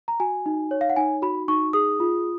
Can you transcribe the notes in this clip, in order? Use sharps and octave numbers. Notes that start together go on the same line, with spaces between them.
A#5
F#4 G#5
D#4
C#5
F5
F#5
D#4 G#5
F#4 B5
D#4 C#6
G#4 D#6
F4